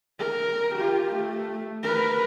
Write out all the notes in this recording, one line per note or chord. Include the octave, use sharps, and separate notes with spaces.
A#4
F4 G4
A3
A#4 B4